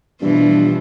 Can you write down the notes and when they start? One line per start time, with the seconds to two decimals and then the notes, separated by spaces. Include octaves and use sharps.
0.22 G2 B2 E3 F3